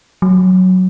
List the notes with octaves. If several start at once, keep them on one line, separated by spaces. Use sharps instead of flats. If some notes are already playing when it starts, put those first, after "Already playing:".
F#3